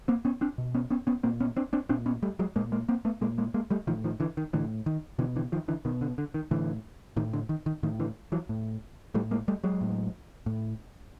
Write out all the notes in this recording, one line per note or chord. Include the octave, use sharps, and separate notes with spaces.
A#3 C4
B3 C#4
C4 D4
B2
B3 C#4
B3 C#4
B3 C#4
A#2 A#3 C4
B3 C#4
C4 D4
C4 D4
A#2 C4 D4
B3 C#4
G3 A3
F#3 G#3
A#2 G#3 A#3
G#3 A#3
A#3 C4
A3 B3
A#2 G#3 A#3
G#3 A#3
G#3 A#3
G3 A3
A2 D#3 F3
D#3 F3
D3 E3
D#3
A2 D3 E3
D#3
B2 D3 E3
D3 E3
D#3 F3
D3 E3
B2 D#3
D3
D3
D#3
A2 D3 E3
A2 D#3
D3
D#3
D#3
A2 D#3
D3 E3
E3 F#3
A2
A2 G3 A3
G#3 A#3
G3 A3
F#3 G#3
A2
A2